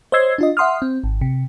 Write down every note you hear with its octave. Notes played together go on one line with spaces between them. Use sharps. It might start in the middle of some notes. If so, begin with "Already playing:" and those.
C5 C#5 D#5 E6 G#6 C7
D4 F4 D#5
E5 F#5 C6 D#6 F6
C4
G#1
C3